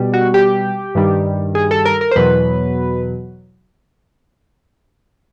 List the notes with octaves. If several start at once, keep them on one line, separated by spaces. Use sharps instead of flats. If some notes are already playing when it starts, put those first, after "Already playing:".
Already playing: B2 G3
F#4
G4
G2 D#3 G3
G#4
A4
A#4
A#4
C5
E2 B2 F#3 B4